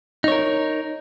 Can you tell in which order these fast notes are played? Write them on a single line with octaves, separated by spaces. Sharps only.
D#4 C#5 A#4